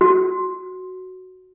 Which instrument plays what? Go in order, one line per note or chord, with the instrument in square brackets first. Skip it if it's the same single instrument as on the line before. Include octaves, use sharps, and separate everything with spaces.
[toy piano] F#4